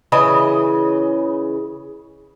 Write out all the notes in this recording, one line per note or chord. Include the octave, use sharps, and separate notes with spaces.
C#3 E3 D#5